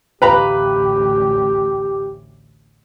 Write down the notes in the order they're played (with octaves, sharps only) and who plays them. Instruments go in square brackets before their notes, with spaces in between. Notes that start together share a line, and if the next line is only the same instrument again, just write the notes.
[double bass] A1 D2 [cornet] G4 [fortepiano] B4 [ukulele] F5 A#5 B5